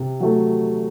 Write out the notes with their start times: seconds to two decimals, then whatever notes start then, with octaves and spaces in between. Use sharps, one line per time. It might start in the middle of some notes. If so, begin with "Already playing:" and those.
Already playing: C3
0.20 F#3 A3